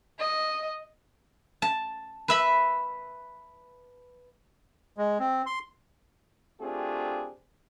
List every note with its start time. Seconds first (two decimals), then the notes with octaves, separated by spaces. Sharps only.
0.19 D#5
1.62 A5
2.28 B4 E5 B5
4.97 G#3
5.20 C4
5.46 C6
6.61 A3 C4 D4 F4 G4 G#4